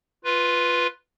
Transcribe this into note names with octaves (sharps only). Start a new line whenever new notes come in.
F4 B4